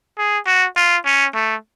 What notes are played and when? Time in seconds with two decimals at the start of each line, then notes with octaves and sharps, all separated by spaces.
0.18 G#4
0.46 F#4
0.76 F4
1.05 C#4
1.35 A3